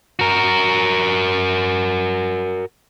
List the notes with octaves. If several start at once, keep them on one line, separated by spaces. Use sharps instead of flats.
F#4 A#4